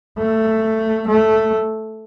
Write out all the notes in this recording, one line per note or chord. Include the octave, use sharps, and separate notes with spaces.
A3
A3